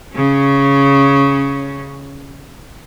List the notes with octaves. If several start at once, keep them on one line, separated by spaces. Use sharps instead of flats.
C#3 C#4